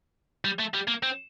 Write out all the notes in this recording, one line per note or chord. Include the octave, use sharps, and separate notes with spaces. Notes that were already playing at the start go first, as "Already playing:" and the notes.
G3
A3
G3
A#3
C4